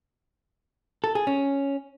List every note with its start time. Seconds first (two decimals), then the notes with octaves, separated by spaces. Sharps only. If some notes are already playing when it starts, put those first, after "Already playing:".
1.04 A4
1.15 G#4
1.27 C#4